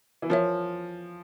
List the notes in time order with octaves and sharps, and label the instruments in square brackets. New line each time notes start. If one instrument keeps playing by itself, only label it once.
[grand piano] E3
[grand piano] F3 [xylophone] A#4 C#5 E5